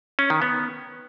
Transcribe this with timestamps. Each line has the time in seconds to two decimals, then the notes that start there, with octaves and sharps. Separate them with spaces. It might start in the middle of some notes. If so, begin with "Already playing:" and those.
0.19 C#4
0.30 D#3
0.42 B3